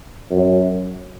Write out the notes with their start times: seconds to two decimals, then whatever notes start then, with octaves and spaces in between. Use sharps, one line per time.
0.31 F#2